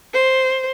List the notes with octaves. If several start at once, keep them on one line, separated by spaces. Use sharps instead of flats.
C5